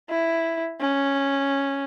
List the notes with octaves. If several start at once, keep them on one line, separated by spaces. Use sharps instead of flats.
E4
C#4